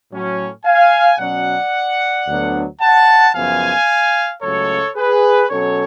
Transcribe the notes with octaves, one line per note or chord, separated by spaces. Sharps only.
A2 F#3 C#4
F5 G#5
B2 F#3 C#4 D5 F#5
D2 D3 F#3 B3 D4
F#5 A5
F#2 C#3 F3 B3 F5 G#5
C#2 C#3 F#3 A3 A4 C#5
G#4 B4
B2 F#3 C#4 A4 C#5